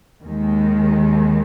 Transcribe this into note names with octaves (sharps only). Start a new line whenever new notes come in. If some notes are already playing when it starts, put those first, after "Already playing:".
D#2 D#3 G#3